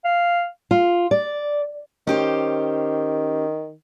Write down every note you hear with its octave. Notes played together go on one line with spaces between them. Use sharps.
F5
F4
D5
D#3 C#4 G4 C5